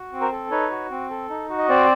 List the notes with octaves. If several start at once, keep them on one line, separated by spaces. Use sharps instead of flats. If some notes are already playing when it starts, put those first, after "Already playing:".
Already playing: F#4
C4
A#4 C5
A4
D#4 B4 C#5
F#4
C4
A4
D#4
F#4
D#5
C4 C5 D5